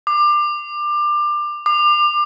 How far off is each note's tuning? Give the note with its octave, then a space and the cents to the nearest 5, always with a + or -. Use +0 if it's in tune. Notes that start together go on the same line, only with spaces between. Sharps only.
D6 +25
D6 +35